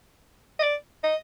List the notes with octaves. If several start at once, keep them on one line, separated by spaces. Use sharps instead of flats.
D#5
D5
D#5